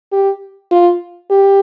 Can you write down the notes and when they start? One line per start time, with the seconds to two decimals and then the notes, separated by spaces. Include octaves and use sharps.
0.12 G4
0.72 F4
1.30 G4